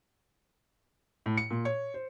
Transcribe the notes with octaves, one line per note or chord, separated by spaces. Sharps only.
A2
C#7
A#2
C#5
C5